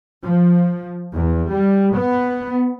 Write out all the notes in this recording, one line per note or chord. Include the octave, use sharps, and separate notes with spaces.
F3
E2
G3
B3